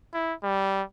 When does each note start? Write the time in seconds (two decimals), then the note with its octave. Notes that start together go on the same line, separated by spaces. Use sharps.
0.14 E4
0.43 G3